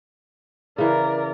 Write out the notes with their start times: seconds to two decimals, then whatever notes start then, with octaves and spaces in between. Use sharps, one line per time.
0.78 C#3 E3 A#4 D5